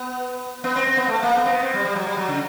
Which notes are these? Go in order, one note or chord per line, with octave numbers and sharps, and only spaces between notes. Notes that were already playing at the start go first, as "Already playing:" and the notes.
Already playing: B3
B3
C4
C4
B3
A3
A#3
B3
C4
B3
C4
G3
G3
F#3
G3
F#3
C#3